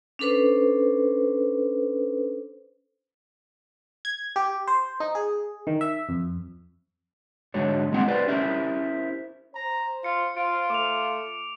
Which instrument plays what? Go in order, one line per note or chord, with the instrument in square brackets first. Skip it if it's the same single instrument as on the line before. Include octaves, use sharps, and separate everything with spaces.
[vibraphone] C#4 D4 A4 B4 C5
[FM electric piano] G#6
G4
C5
D#4
G#4
D#3
E5
F2
[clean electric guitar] G#2 D3 G#3 D4 F#4 C#5
C2 G#3 A#3 C4 E4 F#5
G4 B4 C5 D5
C#4 E4 G4 A#4 C5
[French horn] C5 [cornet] A#5
[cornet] F4 [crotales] C#7
[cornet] F4 [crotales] D7
[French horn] A3 [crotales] D6 F7